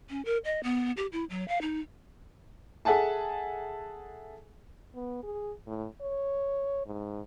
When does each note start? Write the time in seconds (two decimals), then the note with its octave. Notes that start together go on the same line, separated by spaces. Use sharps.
0.10 C#4
0.25 A#4
0.45 D#5
0.63 B3
0.97 G4
1.13 E4
1.30 F#3
1.48 F5
1.61 D#4
2.85 G#4 A4 E5 F#5 G#5 A5
4.95 B3
5.23 G#4
5.67 A2
6.01 C#5
6.86 G#2